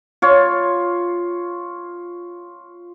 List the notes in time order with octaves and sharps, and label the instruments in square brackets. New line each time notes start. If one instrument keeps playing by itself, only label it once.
[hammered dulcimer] F4 C#5